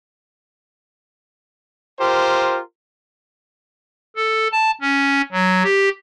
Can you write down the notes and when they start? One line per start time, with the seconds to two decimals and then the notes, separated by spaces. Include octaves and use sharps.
2.00 F4 G4 A#4 C5
4.16 A4
4.52 A5
4.81 C#4
5.32 F#3
5.64 G4